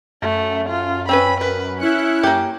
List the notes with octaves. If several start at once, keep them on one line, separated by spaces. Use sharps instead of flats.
F#2 A3
F4
C4 C#4 B4 B5
A#4 B4
C#4 E4 F#6 C#7
F#2 A#3 G4